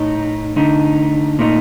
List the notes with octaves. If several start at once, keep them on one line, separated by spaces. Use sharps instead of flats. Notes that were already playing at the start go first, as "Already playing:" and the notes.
Already playing: A2 A3 D#4
D3 A3 D#4
A#2 A3 D#4